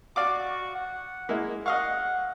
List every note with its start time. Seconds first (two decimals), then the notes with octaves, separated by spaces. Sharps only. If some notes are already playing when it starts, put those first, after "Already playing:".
0.16 F#4 D5 F5 D6
0.75 F#5
1.29 G#3 A#3 E4
1.66 D#5 F5 F#5 C#6